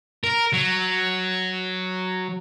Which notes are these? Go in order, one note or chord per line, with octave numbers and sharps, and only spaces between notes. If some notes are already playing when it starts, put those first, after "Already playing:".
A#4
F#3